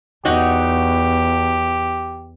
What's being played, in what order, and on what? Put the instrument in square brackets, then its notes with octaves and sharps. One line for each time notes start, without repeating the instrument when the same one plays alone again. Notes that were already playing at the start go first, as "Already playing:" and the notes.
[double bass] E2 [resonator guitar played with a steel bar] D#4 F#4 C#5 [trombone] G4